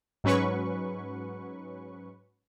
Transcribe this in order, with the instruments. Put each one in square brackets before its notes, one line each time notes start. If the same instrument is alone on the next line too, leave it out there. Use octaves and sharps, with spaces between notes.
[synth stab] G#2 F#3 C#4 B4 C#6